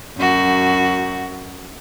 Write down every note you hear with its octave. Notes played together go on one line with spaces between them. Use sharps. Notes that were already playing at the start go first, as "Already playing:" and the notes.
F#2 F#4